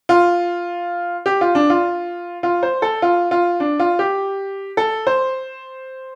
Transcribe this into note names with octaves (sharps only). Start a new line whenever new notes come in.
F4
G4
F4
D4
F4
F4
C5
A4
F4
F4
D4
F4
G4
A4
C5